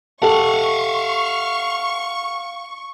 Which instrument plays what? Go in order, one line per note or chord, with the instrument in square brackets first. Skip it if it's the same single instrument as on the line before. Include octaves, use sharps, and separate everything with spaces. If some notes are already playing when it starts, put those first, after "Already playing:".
[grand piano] G4 A4 A5 [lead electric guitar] F5 F#5 [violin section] C#6